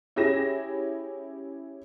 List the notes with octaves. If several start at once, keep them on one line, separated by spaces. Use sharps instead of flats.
C#4 E4 G4 G#4 A#6 E7